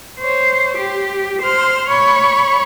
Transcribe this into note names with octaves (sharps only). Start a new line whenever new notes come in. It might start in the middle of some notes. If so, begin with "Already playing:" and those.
C5 C#5
G4
C5 C6 F6
C#5 B5 C#6